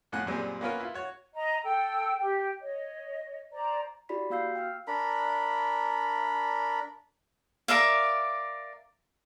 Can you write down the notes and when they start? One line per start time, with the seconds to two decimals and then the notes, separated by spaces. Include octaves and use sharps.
0.12 F2 A2 F#5 G#5 F#6
0.26 F#2 A#2 G3 C4 G#4
0.61 A#3 B3 C#4 F4 A#4 B4
0.80 E4 F4
0.94 F#4 C#5
1.35 D#5 A#5
1.63 A4 G5 E6
2.20 G4 G5
2.60 C#5 D#5
3.52 C5 D5 A#5
4.09 E4 F#4 G4 D5 B5 B6
4.30 A#3 F#4 F5 E6 G6 C7
4.55 G5 E6 F6
4.88 D4 A#4 B5
7.68 A#4 D5 E5 F5